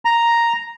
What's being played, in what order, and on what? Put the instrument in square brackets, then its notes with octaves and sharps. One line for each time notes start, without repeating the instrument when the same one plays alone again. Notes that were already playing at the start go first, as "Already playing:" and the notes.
[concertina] A#5